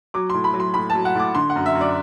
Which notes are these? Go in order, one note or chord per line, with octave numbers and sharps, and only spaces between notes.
F#3 D6
A2 C6
B5
F#3
C6
A2 B5
A5
F#3
F#5
A2 D6
D3 C6
F#5
F#2
E5
F#2
D5